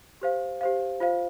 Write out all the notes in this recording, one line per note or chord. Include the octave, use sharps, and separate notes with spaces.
G4 C5 F5
G4 C5 F5
F4 C5 F5